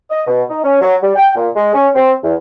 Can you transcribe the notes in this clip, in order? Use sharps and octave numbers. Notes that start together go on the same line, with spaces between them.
D#5
B2
D#4
C#4
F#3
G3
G5
A#2
G#3
C#4
C4
E2